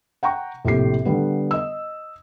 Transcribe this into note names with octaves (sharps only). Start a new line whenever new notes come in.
F#5 G5 A#5 C#6
A#1 A2 C3 G4 C7
D3 G3 B3
D#5 E6